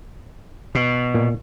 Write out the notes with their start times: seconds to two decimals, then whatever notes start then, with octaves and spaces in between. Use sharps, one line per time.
0.75 B2
1.14 A#2